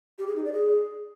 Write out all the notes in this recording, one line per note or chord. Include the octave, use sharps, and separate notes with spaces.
G4
G#4
D#4
D5
G#4